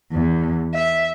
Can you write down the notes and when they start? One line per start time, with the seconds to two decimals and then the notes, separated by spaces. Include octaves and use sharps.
0.12 E2
0.74 E5